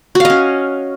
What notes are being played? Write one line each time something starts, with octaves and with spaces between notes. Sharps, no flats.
C#4 F#4 D#5 F5